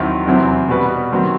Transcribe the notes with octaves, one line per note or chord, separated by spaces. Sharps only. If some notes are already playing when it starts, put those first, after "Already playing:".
Already playing: D#2 D#3 F#3 C4 E4
E2 C3 F#3 C4 E4
B2 G3 B3 F#4 B4
D#3 F#3 C4 F#4